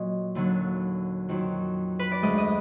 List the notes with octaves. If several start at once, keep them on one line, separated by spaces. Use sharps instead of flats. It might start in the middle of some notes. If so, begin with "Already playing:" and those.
Already playing: A#2 F#3 D#5
D#2 D3 F#3
F2 D#3 F#3
B4
D5
D2 D3 G#3 D#5
D#5